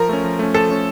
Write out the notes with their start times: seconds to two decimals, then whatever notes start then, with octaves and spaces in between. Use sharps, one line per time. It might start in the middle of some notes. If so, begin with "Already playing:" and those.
Already playing: F3 A#4
0.09 A3 C#4
0.24 F3
0.39 A3 C#4
0.54 F3 A4
0.69 A3 C#4